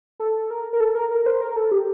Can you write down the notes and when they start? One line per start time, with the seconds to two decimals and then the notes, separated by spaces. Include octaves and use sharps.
0.20 A4
0.50 A#4
0.73 A#4
0.80 A4
0.95 A#4
1.11 A#4
1.26 C5
1.41 A#4
1.56 A4
1.71 G4